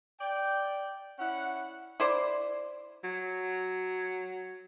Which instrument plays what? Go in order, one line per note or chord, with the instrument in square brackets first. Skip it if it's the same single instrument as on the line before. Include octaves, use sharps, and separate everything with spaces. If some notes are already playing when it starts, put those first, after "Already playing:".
[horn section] D5 G5
C#4 E4 D5 F#5
[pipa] E4 C5 D5
[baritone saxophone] F#3